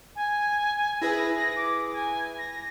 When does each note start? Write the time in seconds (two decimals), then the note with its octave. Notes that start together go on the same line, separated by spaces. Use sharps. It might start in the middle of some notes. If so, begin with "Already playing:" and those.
0.16 G#5
1.02 E4 G#4 B4 A#6
1.56 D6
1.93 G#5
2.39 A#6